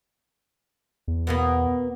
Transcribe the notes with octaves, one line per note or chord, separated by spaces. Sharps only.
E2
B2 A#3 B3